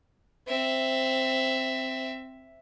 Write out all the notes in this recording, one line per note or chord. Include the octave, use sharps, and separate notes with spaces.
C4 E5